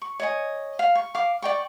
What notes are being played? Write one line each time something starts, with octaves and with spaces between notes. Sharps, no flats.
C#6
C#5 D#5 G#5
F5
C#6
F5 D6
D5 G5 C#6